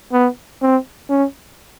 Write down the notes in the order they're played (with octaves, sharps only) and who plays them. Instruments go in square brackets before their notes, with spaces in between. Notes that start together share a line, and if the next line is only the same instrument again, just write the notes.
[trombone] B3
C4
C#4